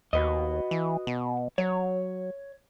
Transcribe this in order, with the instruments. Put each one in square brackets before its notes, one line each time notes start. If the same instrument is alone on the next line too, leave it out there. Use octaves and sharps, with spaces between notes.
[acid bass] D#2 [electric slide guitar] F#4 B4 D#5
[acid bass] E3
B2
[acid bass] F#3 [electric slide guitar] C#5